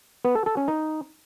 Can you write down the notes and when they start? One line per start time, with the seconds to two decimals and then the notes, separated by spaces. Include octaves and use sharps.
0.25 B3
0.35 A4
0.46 A4
0.57 C#4
0.68 D#4